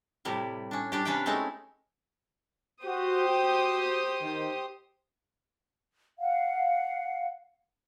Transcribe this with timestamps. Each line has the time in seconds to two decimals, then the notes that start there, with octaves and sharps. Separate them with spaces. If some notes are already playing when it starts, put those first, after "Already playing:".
0.25 A2 C3 G3 E4
0.71 C#4 D4
0.92 G3 D4 G4
1.05 C3 C#4 D4 B4 F5 G5
1.26 G#3 A3 C4 C#4 D#4 E4
2.84 F#4 G4 C5 D#6
3.28 F#4
4.22 D#3
6.19 F5 F#5